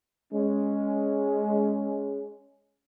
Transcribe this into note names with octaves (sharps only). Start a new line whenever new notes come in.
G#3 C#4